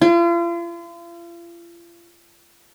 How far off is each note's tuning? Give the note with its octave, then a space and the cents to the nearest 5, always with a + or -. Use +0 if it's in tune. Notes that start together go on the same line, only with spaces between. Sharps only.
F4 -40